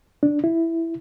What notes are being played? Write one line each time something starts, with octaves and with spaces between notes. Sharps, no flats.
D4
E4